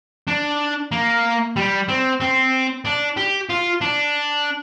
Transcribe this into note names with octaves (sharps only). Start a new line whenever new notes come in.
D4
A#3
G3
C4
C4
D4
G4
F4
D4